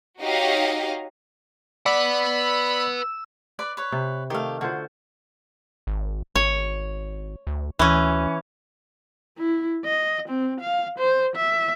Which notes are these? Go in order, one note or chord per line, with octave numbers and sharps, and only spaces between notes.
D#4 F#4 G4 C#5 D#5 F5
B4 D5 F#5 B5 E6
B4 D5 B5
B4 C#5
C3
D#3 A3 G4 F5
D3 F4 F#4 C5
G#1
G#1 C#5
D2
D2 E3 C#4
E4
D#5
C4
F5
C5
E5